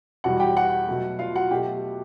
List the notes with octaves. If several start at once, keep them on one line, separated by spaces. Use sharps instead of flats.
E2 B2 G3 F#4 F#5
G4 G5
F#4 F#5
B2 F#3 A3
F4 F5
F#4 F#5
B2 F#3 A3 G4 G5